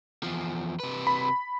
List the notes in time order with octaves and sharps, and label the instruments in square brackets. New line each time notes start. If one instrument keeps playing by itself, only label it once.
[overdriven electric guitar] E2 F3
C3 B4
[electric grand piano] B5